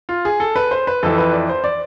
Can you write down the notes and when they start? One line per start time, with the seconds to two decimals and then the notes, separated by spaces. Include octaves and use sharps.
0.09 F4
0.25 G#4
0.40 A4
0.56 B4
0.71 C5
0.87 B4
1.03 F2 E3 A4
1.18 B4
1.33 D5
1.49 C5
1.64 D5